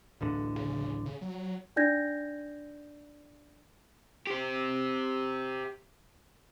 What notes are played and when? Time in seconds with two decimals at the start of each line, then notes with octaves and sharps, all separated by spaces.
0.21 D1 A1 D3
0.56 C#3
1.06 C#3
1.21 F#3
1.76 D4 D#4 D5 G6 G#6 A#6
4.27 G4 C5